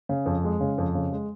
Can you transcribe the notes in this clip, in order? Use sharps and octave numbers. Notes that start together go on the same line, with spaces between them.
C#3
F2
G#3
C#3
F2
C#3
G#3